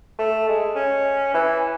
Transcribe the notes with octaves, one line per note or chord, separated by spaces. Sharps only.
A3
G#3
C#4
E3